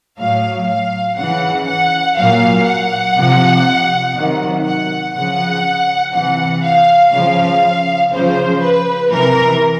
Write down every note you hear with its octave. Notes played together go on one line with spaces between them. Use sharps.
A2 F#3 F5
F5
C#3 E3 F#5
F#5
A#2 F#3 F5
F#5
C3 F3
C3 D#3 F#3
F#5
C#3 F3 F#5
C3 E3 F#5
F5
C#3 F3 F5
C#3 F3 C5
B4
C3 E3 A#4